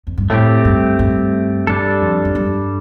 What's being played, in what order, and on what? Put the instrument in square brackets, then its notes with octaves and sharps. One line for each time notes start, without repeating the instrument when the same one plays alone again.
[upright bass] F2
G2
[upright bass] A2 [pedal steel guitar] A3 C4 G4
[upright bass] G2
G2
[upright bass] G2 [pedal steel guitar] G3 D4 A4
[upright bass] F2
F2
G2